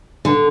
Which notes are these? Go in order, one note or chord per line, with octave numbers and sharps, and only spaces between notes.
D3